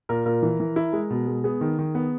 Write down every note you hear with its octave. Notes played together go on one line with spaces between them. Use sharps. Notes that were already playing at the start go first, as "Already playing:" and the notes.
A#2 A#4
A#2 A#4
E3
E3
E4
G#3
B2
G#3
B3 G#4
D#3
D#3
B3